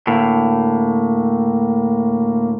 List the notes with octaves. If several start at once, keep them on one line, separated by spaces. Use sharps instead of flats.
D2 A2 A#3